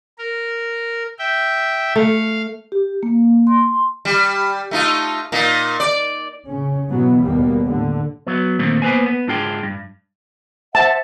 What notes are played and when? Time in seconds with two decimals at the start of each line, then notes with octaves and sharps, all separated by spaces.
0.18 A#4
1.19 E5 G5
1.96 A3 F5
2.72 G4
3.03 A#3
3.47 C6
4.05 G3
4.71 A3 D#4 F4
5.32 A#2 D#4
5.80 D5
6.47 C#3 C#4
6.89 B2 E3 F#3 B3
7.22 D#2 B2 G3 A#3 B3
7.63 A2 D3
8.27 F#3 B3
8.59 A#2 D#3 A3 A#3 C4
8.82 A#3 B3 B4 C5 G#5
9.06 B3
9.28 G#2 D4 F4 G#4 G5
9.63 G2
10.75 C5 E5 F#5 A5